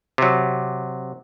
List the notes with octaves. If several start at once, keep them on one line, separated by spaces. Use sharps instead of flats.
C3 F#3